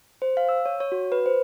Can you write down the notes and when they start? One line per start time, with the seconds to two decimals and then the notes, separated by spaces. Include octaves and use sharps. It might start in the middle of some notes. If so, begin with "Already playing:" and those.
0.22 C5
0.37 F5
0.49 E6
0.66 C#5
0.80 C#5
0.92 F#4
1.12 B4
1.26 C5